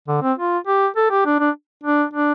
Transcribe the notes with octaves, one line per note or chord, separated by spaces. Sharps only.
D3
C4
F4
G4
A4
G4
D4
D4
D4
D4